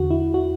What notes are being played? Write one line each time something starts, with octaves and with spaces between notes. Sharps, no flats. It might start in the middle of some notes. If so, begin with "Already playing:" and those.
Already playing: E2 D3 F#4
E4
F#4